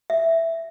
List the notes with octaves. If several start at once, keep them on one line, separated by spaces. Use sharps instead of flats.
E5